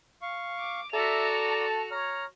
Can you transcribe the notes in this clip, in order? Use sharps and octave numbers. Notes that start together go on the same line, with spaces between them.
F5 C#6
D6
F#4 A4 D5 E5 A#5 F7
A5
C#5 A#5 F6